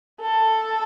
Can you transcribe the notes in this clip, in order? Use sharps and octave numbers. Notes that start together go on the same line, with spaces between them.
A4